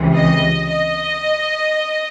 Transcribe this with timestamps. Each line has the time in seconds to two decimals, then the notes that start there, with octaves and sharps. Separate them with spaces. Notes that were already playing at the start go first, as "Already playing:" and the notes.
Already playing: C#2 C3 E3
0.16 D#5
0.71 D#5